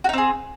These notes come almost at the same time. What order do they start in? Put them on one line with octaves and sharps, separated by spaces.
F#4 D#4 C4 G#4